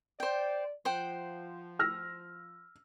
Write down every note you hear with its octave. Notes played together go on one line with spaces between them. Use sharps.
C5 D5 G5
F3 C5 F#5 G5
E6 F6 A#6